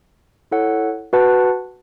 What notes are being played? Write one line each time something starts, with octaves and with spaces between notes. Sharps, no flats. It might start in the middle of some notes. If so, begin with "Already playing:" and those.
E4 A4 C#5 F#5
F#4 B4 F#5 A5